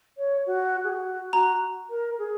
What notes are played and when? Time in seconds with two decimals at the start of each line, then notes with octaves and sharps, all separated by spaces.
0.18 C#5
0.46 F#4
0.84 G#4
0.89 F#4
1.32 F#4 A#5
1.90 A#4
2.19 G#4